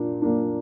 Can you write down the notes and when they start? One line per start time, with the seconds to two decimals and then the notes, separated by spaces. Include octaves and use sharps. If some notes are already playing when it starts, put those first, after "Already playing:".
Already playing: A#2 A#3 D4
0.22 A#2 A#3 D4